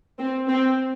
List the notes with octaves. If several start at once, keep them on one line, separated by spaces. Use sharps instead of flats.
C4
C4